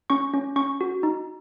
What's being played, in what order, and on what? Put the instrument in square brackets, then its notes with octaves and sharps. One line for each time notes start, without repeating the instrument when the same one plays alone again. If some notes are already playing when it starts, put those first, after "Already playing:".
[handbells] C#4 C#6
C#4
C#4 C#6
F#4
D#4